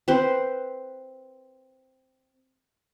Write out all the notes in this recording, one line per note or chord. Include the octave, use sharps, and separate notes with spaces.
C4 B4 C5